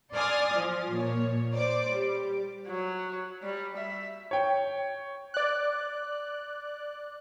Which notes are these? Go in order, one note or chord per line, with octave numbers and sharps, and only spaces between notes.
D5 G#5 C6 D#6 F6 A6
F3
A#2 C#5
C5 D5 D6
G3
F#3
G3
E5
C#5 G5
D5 F#6